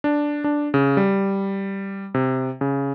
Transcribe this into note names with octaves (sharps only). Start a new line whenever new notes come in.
D4
D4
C#3
G3
C3
C#3